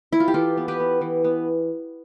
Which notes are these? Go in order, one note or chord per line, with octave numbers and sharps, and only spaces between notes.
E4
F4
G4
E3 F4 A4
B3
G4 B4
B3
E3
B3